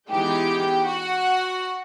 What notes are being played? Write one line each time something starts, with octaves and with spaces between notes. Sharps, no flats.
E3 G#3 B3 D#4 G4 G5
F#4 F#5